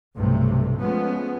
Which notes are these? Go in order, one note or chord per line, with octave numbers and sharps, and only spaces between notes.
B1 G2 C3 A3
F3 G#3 A3 B3 C#4